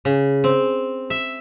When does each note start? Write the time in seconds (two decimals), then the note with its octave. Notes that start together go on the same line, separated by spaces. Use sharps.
0.05 C#3
0.44 C4
1.10 E5